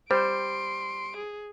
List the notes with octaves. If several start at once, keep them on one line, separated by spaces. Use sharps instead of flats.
G3 C5 C6 D7
G#4